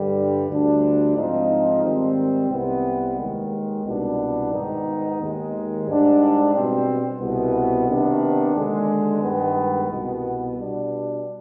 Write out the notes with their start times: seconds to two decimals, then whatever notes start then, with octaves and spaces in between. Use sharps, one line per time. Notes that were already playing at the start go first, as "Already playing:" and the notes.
Already playing: G2 D3 G3
0.49 D2 D3 G3 D4
1.16 G#2 F3 C4 D#4
1.83 G#2 D#3 G3 C4
2.51 C2 C3 G3 B3
3.18 D#2 D#3 G#3
3.85 C2 B2 G3 B3 D4
4.52 G#2 D#3 B3 D#4
5.19 D#2 D#3 G#3
5.86 G#2 G3 D4
6.53 B2 G3 C4
7.21 C2 B2 B3
7.88 C3 D#3 B3 D4
8.55 D#2 D3 G#3
9.22 G2 D#3 G#3 B3
9.88 C2 B2 B3
10.56 B2 G3 D4